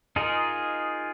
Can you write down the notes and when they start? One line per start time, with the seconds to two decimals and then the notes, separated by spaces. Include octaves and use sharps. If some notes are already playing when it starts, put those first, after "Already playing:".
0.16 D#4 F4 G#4 A#4